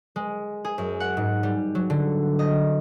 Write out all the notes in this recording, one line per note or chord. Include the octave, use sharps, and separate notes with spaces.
G#3
G#4
F#2
F#5
G#2
G3
F#3
D3
D#5